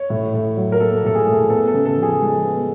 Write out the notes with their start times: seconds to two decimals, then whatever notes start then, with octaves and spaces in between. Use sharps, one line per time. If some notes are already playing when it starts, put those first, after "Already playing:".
Already playing: C#5
0.10 A2
0.34 A2
0.57 F#3
0.72 A#4
0.80 A#3 A4
1.04 A2 A4
1.15 G#4
1.27 A2
1.50 B3 A4
1.68 A4
1.74 C#3
1.85 A4
1.97 F3
2.03 G#4
2.20 G#3
2.44 B3